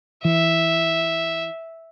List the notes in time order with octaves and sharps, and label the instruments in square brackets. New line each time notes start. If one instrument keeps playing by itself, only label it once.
[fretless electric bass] E3 [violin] E5